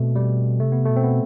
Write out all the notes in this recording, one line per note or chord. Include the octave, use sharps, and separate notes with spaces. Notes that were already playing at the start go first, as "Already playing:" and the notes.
Already playing: B2 A3 B3 C4
G3
C3 A3
B3
B2 A3
C4
B3